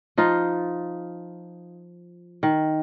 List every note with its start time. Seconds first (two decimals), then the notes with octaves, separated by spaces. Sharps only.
0.18 F3 D#4 F4
2.43 D#3